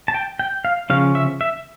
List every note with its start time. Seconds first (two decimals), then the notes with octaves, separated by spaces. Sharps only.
0.08 A5
0.14 G5
0.39 G5
0.65 F5
0.90 C#3 F3 C#4 F5
1.15 E5
1.41 E5